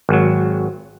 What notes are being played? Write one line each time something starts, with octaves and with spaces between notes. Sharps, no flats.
G#1 F#3